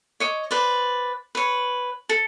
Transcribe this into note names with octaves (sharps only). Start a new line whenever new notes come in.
C#5 D#5 D6
B4 C5 D5
B4 C#5
A4